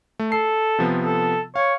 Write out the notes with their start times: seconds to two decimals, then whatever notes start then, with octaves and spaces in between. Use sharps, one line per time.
0.19 A3
0.32 A4 C7
0.79 C3 F3 B3
1.04 A4
1.56 C#5 F5